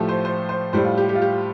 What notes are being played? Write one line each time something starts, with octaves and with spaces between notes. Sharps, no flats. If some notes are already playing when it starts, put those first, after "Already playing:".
Already playing: A2 F3 A3 G4 A4
C5
C5
C5
A2 G3 C5
F4
G4
G4
F4
G4